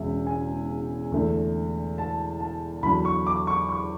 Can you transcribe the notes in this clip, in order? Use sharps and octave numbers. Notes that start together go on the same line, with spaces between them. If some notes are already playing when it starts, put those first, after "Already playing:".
Already playing: E1 E2 C#3 G#3 E5
G#5
E2 D3 A3
A5
A5
E2 D3 F#3 B5
C#6
D6
C#6
C#6